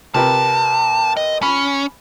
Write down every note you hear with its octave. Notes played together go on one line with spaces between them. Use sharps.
C3 A#4 B4 A5
D#5
C#4 B5